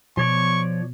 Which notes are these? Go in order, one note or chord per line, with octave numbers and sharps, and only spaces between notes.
B2 F3 C#5 D5 C#6